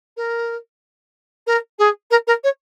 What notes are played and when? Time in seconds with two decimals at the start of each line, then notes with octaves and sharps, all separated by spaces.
0.17 A#4
1.47 A#4
1.79 G#4
2.11 A#4
2.27 A#4
2.44 C#5